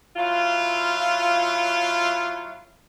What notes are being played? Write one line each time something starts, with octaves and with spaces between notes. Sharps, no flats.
F#3 E4 F4